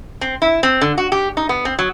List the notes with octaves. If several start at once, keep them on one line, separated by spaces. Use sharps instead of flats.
C4
E4
C4
D3
F#4
G4
D#4
B3
C4
F#3